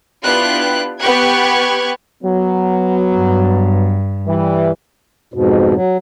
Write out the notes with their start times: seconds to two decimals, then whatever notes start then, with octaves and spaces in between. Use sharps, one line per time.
0.24 B3 D4 E4 F4 G4 F#6
1.00 B3 G4 C#6 F#6 G#6
2.23 F#3 B3
3.17 G2
4.27 E3 G3
5.34 F2 G#2 B2
5.75 F#3